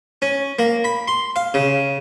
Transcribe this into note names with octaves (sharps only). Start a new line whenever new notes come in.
C#4
A#3
B5
C6
F5
C#3